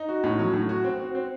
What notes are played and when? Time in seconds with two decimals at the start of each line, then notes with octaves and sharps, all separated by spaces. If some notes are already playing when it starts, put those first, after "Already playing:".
Already playing: D#4
0.09 F#4
0.24 A2
0.39 F#3
0.54 A2
0.69 F#4
0.84 C4
1.00 F#4
1.15 C4